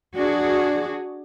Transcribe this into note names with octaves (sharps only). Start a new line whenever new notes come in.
D4 F#4 G#4